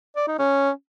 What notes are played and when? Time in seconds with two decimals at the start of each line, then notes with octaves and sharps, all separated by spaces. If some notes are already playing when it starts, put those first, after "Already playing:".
0.16 D5
0.28 D#4
0.39 C#4